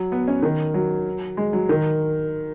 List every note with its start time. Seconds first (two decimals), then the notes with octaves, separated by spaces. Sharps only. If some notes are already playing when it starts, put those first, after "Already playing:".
Already playing: F#3
0.12 B3
0.27 C#4
0.42 D#3
0.74 F#3
1.37 G#3
1.53 F#3
1.69 D#3